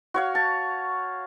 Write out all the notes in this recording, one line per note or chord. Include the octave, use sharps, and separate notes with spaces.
F#4 C#5 F5
A5